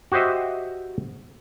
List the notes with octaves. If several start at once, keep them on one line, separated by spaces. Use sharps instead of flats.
F#4 G4 C5 D#5 E5